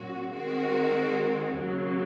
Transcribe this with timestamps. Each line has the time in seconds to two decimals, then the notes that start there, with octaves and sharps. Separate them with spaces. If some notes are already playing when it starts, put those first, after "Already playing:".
Already playing: A#2 F#3 C#4 F#4
0.31 D#3 G#3 C4 F#4 A#4
1.56 D#2 C#3 F#3